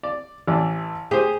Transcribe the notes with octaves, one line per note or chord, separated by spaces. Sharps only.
D5
A1 E3 D5
G4 G#4 C5